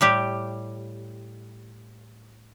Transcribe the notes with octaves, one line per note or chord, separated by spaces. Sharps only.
A2 G3 G4